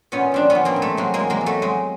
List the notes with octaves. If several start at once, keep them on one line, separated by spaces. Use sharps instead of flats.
A#2 B3 C#4
F3 C4 D4
B3 C#4
F3
A#3 C4
A#2
A3
F#3 G#3 A#3
G#3 A#3
E2
G#3 A#3
F#3
A3
F#3 G#3